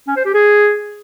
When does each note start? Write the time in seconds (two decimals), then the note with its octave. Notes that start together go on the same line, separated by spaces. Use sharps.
0.07 C#4
0.16 C5
0.25 G4
0.34 G#4